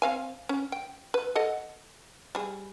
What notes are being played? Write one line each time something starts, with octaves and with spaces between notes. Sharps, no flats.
C4 F5 G#5
C#4
G5
B4
A4 D#5 F#5
G3 G#4